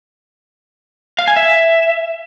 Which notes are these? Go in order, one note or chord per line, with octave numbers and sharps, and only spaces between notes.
F5
G#5
E5